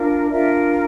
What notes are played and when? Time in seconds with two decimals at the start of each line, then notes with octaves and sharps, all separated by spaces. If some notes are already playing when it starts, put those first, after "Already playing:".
Already playing: D4 F4 A#4
0.30 D4 F4 A#4 D5 E5